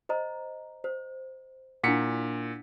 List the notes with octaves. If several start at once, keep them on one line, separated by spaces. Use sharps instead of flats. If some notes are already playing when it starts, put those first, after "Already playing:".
C5 D#5 A#5
C5
A#2 D4 E4 F#5 B6 C#7